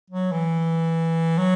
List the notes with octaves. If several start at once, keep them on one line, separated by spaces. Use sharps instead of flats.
F#3
E3
F#3